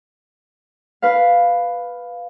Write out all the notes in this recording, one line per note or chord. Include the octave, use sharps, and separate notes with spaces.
B4 F5